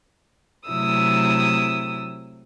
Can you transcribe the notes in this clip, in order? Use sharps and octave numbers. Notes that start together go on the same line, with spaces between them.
C3 F#3 A3 E4 D#6 E6